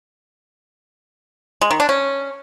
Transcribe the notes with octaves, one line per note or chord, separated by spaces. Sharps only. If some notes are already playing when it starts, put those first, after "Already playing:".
G#3
D#3
D4
C#4